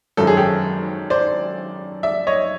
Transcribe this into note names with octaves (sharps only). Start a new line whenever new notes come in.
G#1 F#2 D#3 F#3 A4
G#4
G4 A4
C5 D5
D5 E5
C#5 D#5